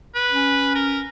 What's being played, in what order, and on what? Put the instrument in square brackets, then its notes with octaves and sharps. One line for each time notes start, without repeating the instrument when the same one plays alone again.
[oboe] B4
[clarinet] C#4
[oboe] A#4